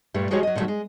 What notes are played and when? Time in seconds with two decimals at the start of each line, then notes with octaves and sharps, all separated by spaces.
0.14 G2 A#2 G3 A3
0.31 F3 G#3 F#4 G4 C5 C#5
0.43 F#3 D#5
0.55 A#2 D3 D#3 F3 F#3 A3
0.68 G#3